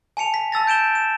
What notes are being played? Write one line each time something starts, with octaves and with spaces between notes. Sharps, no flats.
G#5 A5 C#7 F7
B6
A5 E6 A6 A#6
G6 D7 E7 G7
E7